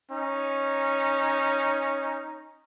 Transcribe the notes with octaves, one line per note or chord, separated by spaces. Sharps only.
C#4 D#4